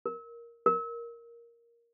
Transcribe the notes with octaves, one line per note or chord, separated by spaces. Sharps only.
A#4
A#4